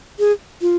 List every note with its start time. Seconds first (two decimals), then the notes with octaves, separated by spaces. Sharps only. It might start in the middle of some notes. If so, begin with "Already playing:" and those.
0.19 G#4
0.62 F4